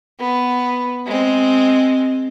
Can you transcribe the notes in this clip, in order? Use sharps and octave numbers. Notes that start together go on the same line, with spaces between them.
B3
G#3 C4